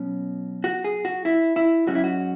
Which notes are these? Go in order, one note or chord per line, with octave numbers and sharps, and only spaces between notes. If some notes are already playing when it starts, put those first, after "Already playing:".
Already playing: B2 F#3 C#4
F#4
G#4
F#4
E4
E4
G#2 F#3 C#4 F#4
E4
F#4